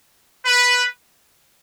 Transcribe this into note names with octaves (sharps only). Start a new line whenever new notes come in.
B4